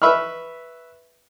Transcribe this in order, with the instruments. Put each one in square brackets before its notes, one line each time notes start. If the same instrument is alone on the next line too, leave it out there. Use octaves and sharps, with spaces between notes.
[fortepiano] B4 E5 B5 C#6 F6